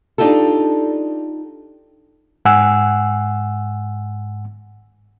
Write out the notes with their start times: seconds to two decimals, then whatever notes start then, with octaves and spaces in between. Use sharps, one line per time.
0.18 D4 D#4 F4 G4 A4
2.45 G#2 F#5 G#5 E6